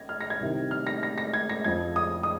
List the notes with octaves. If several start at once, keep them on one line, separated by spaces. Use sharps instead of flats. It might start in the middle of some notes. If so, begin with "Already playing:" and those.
Already playing: G#6 A#6
F6
A#6
G#6
C2 C3 D#3
F6
A#6
A#6
A#6
G#6
A#6
F2 F3 G#6
D#6
D#6